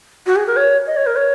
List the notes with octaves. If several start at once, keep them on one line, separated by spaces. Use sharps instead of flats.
F#4
G#4
A#4
C#5
D#5
C#5
A#4
C#5